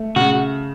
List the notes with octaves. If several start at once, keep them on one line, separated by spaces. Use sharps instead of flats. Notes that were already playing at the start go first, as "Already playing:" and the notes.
Already playing: A3
C#3 F#4